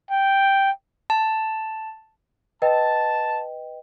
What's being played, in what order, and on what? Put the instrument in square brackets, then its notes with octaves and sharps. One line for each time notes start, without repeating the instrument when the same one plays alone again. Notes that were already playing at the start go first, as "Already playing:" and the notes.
[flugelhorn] G5
[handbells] A5
[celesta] B4 D#5 G5 [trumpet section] A5